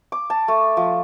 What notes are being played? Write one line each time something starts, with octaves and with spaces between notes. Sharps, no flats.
D6
A5
A3
F3